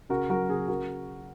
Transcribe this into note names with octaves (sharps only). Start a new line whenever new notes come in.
C#3 F#4 A#4
F#3 F#4 A#4
C#3 G#4
C#3 F#4 A#4